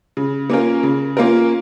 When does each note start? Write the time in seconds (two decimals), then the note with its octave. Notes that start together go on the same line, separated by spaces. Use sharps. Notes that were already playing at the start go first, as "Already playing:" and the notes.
0.17 C#3
0.50 A#3 C#4 F4 A#4
0.83 C#3
1.17 A#3 C#4 F4 A#4